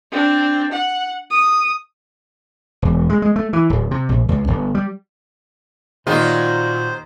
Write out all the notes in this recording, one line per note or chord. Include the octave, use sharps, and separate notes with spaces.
C4 D4
F#5
D#6
E1
G#3
G#3
A3
E3
D1
C3
A#1
C#2
G1
G3
A#2 D#3 F#3 G3 A#3 F4 C5